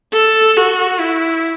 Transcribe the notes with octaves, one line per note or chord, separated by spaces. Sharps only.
A4
F#4
E4